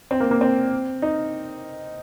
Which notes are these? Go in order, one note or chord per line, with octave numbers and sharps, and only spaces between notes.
C4
A#3
A#3
C4
D#4